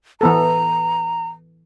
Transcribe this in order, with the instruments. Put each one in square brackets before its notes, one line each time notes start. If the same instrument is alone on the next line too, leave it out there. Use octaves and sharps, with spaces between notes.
[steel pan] E3 B3 A4 [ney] A#5